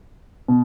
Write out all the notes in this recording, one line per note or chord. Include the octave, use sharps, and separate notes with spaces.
B2